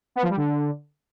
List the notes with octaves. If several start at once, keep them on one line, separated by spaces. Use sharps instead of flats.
B3
F3
G3
D3